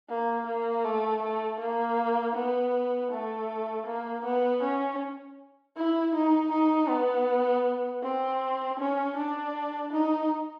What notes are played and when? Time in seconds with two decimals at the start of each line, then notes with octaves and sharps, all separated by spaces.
0.09 A#3
0.47 A#3
0.84 A3
1.22 A3
1.60 A#3
2.35 B3
3.11 A3
3.86 A#3
4.24 B3
4.62 C#4
5.77 E4
6.15 D#4
6.52 D#4
6.89 B3
8.03 C4
8.79 C#4
9.16 D4
9.92 D#4